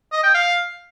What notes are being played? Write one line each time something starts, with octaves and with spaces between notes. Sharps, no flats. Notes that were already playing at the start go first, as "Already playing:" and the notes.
D#5
G5
F5